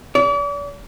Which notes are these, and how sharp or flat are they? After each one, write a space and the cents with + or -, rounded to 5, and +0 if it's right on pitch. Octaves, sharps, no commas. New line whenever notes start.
D5 -40